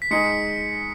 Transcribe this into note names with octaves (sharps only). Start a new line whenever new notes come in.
B6
G#3 D#4 G#4 C#7